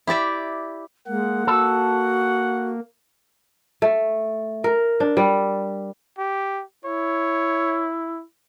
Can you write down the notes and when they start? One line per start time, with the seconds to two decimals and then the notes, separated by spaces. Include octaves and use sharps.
0.07 E4 G4 D5 E5
1.08 G#3 A#3 F#5
1.47 F#4 A4
3.82 A3
4.64 A#4
5.00 D4
5.17 G3
6.18 G4
6.85 E4 C#5